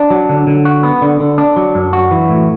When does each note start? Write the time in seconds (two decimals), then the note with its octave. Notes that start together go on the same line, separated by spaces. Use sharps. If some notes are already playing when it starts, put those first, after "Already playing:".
Already playing: D4
0.10 F#3
0.29 D3
0.47 D3
0.65 F#4
0.83 B3
1.02 D3
1.20 D3
1.38 D4
1.56 F#3
1.75 F#2
1.93 F#4
2.11 E3
2.29 A2